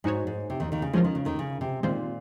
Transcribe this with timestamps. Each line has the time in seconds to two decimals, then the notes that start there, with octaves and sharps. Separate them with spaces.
0.04 G#2 G#3 D#4 F#4 C#5
0.27 G#2
0.50 C3
0.60 D#2 D#3
0.72 D#2 D#3
0.82 C#3
0.93 F3 G#3 C#4 F4 A#4
1.04 D#3
1.15 C#3
1.25 D#2 D#3
1.39 C#3
1.61 C3
1.83 A#2 D#3 G#3 C4 F4 C5